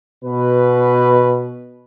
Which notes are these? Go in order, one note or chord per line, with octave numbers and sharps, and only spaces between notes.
B2 B4